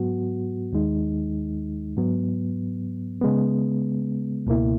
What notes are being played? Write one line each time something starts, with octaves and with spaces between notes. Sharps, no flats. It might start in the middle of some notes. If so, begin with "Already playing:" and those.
Already playing: G#2 F#3 B3 F#4
D#2 D#3 G#3 D#4
G#2 F#3 B3
C#3 G#3 B3
C#2 B2 A#3 E4